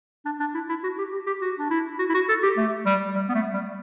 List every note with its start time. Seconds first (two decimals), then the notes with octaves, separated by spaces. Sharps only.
0.25 D4
0.40 D4
0.54 E4
0.69 E4
0.83 F#4
0.98 G4
1.12 G4
1.26 G4
1.41 F#4
1.58 D4
1.70 E4
1.99 F#4
2.09 E4
2.14 F#4
2.28 A4
2.43 G4
2.57 A3
2.86 G3
3.15 G3
3.29 B3
3.34 A3
3.53 G3